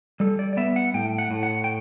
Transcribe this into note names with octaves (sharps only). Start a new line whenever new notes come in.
G3 A4
D5
D5
B3 E5
F#5
A2 G5
F#5
A2
F#5
G5